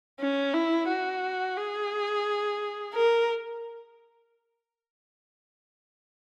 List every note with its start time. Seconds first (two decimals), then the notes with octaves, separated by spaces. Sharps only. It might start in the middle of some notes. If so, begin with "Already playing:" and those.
0.20 C#4
0.54 E4
0.89 F#4
1.57 G#4
2.94 A#4